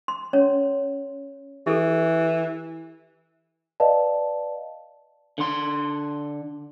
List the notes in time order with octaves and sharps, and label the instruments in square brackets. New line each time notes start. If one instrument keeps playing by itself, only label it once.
[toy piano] C6
C#4 C#5
[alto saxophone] E3 [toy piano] G4 A4
[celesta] B4 D5 D#5 F5 A5
[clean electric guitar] D3 C6